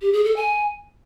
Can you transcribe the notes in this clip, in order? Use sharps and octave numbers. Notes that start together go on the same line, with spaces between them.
G4
G#4
A4
G#5